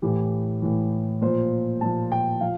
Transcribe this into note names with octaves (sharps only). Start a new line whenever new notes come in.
A2 E3 G4
A2 E3
A#2 F3 C5
A#2 F3 A5
G5
F3 F5